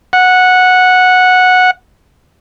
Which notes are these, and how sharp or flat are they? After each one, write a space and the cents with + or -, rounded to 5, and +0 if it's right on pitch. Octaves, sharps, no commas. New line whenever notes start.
F#5 -10